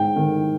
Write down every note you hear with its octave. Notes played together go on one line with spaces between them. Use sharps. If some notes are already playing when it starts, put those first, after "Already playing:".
Already playing: G#2 G5
D#3